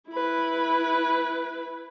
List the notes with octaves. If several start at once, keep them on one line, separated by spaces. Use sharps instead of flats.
E4 B4